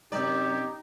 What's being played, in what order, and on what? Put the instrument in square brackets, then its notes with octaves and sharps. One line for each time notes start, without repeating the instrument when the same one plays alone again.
[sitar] F#2 D5 [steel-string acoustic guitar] C3 C4 [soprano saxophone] D#4 [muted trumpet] G4